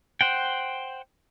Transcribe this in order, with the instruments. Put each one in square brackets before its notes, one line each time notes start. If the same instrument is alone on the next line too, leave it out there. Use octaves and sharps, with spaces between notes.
[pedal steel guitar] C5 F#5 G5